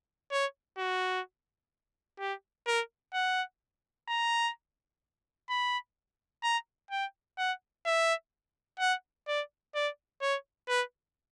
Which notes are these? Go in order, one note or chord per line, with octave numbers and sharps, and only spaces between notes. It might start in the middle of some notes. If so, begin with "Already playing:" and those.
C#5
F#4
G4
A#4
F#5
A#5
B5
A#5
G5
F#5
E5
F#5
D5
D5
C#5
B4